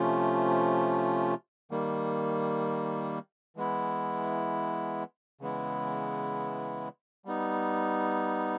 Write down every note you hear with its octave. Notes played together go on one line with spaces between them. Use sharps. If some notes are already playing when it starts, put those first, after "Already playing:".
Already playing: C3 F3 A3 C#4 F4
D#3 G3 A#3
E3 G#3 B3 E4
C#3 E3 G#3 B3 E4
G3 B3 D#4